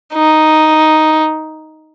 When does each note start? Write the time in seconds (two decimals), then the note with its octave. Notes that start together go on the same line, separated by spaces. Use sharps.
0.14 D#4